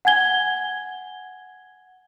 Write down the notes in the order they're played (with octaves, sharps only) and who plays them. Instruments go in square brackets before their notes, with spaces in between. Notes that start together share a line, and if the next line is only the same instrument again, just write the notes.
[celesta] F#5 G#5 G#6 G7